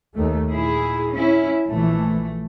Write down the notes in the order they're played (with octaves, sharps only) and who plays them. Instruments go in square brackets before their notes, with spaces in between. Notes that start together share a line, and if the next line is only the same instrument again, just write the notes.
[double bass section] D#2 D#3 A3
[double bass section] A#2 [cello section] E4 G#4
[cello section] C#4 E4
[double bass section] A#1 E3 [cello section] A3